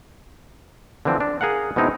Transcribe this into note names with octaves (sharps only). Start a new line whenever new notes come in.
D3 E3 F3 C4 A4
D4
G#4 A#4 F5 F#5
B2 G#3 C4 D#4 E4